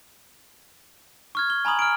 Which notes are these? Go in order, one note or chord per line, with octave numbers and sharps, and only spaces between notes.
C#6 F6 G#6
G7
G#5 A#5 B5 D#6 F#7
F6 D7